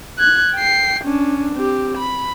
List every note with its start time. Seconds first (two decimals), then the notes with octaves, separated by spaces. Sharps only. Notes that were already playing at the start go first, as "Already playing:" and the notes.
0.19 F#6 G#6
0.55 G5 C7
1.04 C#4 D4
1.55 C4 G4
1.98 B5